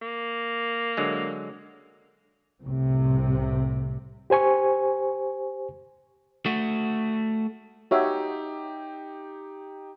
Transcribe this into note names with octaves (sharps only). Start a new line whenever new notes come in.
A#3
D3 F#3 G#3
C2 A2 C3
G4 C5 G#5 C#6
A3 F#4
D#4 F#4 G4 C#5 E5